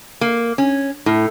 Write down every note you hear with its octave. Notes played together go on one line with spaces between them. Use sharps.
A#3
C#4
A2